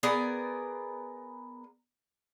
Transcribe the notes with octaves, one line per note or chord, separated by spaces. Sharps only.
B3 G#4 A#4 D5